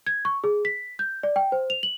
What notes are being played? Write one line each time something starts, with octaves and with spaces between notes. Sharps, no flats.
G#6
C#6
G#4
B6
G6
D5
G5
C5
F7
F#7